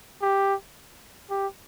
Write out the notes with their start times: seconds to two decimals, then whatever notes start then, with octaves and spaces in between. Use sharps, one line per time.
0.22 G4
1.30 G4